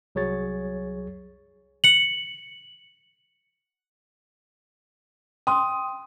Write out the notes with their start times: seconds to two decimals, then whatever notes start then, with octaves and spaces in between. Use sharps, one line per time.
0.15 C2 F#3 G#4 C#5 A6
1.84 C#7 F#7
5.47 G5 C6 D#6